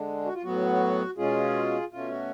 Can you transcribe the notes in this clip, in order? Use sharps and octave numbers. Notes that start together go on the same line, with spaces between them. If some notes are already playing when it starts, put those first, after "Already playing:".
Already playing: D3 G#3 D4
F#4
F4
A2 F#3 B3 F#4
B2 G#3 C#4 F4 G#4
B2 A3 C#4 F4
F#4